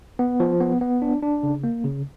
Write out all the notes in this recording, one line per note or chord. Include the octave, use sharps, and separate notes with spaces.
B3
F3
B3
B3
D4
D4
C#3
A#3
C#3